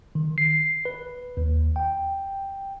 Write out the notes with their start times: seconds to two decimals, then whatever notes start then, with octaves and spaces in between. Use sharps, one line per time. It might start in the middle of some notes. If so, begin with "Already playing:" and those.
0.15 D#3
0.38 C7
0.85 B4
1.37 D#2
1.76 G5